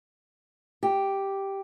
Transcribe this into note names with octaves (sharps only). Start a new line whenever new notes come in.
G4